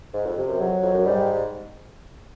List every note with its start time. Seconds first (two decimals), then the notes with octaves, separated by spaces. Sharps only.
0.14 G#2
0.26 F2
0.37 C3
0.48 F#2
0.60 F2 F#3
0.83 F2
0.94 F#2
1.06 G#2 G3